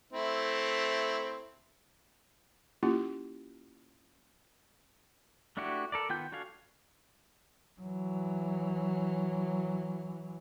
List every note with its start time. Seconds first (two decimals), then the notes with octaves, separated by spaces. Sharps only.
0.13 A3 C4 E4
2.83 A#3 C#4 E4 F4 G4
5.57 A3 D4 E4 F#4 G4
5.92 A4 A#4 D5
6.09 D#3 B3 F4 G5 G6
6.32 D4 F#4 A4 F5 G#5
7.81 E3 F#3